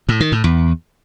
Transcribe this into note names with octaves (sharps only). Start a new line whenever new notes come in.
A2
D#3
A2
E2